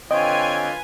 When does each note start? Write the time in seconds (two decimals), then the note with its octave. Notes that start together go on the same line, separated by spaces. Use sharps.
0.11 D3 C4 F4 B4 C#5 D#5 G5 G#5